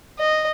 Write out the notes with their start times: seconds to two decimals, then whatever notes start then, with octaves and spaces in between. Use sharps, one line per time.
0.19 D#5